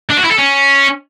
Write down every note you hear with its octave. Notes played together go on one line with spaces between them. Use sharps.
D4
F#4
E4
A4
C#4